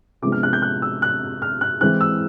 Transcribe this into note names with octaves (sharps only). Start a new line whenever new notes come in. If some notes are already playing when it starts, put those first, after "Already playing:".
C3 F3 G#3 B3 D4 D6
F6
F#6
G6
F#6
E6
F#6
F6
F#6
E3 G#3 C4 E4 F#6
E6